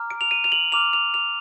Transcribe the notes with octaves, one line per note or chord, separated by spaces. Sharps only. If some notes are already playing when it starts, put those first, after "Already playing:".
Already playing: A#5 D6 F6
D7
F7
D#7
F7
F#7
A#5 D6 F6 F7
F7
F7